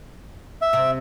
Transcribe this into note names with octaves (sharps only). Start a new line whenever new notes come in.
E5
C3